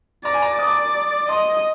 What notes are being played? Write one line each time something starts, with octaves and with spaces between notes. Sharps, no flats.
D5 A#5
G#5
A#5
D6
D5 D#6
D6
D#5 C6